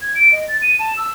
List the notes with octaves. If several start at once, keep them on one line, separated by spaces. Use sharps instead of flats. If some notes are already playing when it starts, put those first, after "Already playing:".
G#6
D7
D#5
A6
D#7
A5
E6